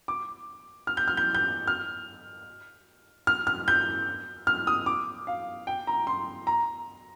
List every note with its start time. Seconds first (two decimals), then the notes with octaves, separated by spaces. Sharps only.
0.08 D6
0.87 F6
0.97 G6
1.08 F6
1.17 G6
1.35 G6
1.67 F6
3.27 F6
3.47 F6
3.68 G6
4.47 F6
4.67 D#6
4.86 D6
5.27 F5
5.67 G5
5.87 A#5
6.07 C6
6.47 A#5